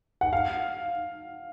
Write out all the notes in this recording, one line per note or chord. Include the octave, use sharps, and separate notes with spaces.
F#5
F5